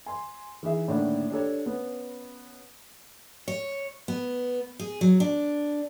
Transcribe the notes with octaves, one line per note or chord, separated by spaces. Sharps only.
G#5 C6
E3 D#4 G#4 E5
A2 D3 D#3 A#3 D4 E4
D4 G4 A4 C#5
B3 C#4
C#5
B3
G#4
F#3
D4